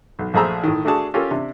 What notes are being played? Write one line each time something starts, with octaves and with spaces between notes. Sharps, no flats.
B1
A#1 A3 G#4 C5 A#5 E6
A2 D#3
A3 D4 F#4 G#4 A5
C#4 F4 G4 A4 A#4
C3 D4